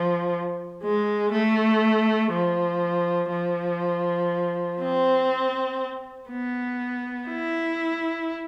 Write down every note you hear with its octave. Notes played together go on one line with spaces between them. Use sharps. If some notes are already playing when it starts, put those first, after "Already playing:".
Already playing: F3
G#3
A3
F3
F3
C4
B3
E4